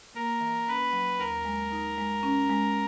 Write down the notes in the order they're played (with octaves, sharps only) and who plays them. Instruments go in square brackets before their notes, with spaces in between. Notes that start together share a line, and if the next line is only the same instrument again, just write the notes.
[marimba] A#3 [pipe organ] A#4
[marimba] E3
[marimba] C#4 [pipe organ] B4
[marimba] F#3
[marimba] D#2 [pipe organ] A#4
[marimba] G#3
D#4
G#3
C#4
G#3